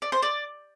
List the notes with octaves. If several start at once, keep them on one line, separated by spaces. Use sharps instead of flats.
D5
C5
D5